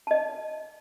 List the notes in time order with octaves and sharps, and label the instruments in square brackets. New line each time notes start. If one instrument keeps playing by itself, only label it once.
[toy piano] D#5 A5